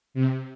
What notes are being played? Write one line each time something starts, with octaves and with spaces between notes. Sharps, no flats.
C3